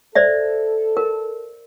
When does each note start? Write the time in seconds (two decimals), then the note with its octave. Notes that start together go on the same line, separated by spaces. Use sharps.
0.15 A4 C5 D5 E5
0.97 A#4